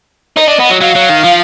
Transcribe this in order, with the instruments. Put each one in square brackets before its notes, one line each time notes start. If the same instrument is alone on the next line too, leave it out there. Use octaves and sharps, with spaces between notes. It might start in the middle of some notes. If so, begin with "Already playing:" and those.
[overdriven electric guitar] D#4 [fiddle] D#5
[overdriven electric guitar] D4
B3
F#3
[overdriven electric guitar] F#3 [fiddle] F5
[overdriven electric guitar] F#3
D#3
F3